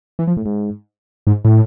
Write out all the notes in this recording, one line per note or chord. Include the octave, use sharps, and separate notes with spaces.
E3
F3
A2
G#2
G#2
A2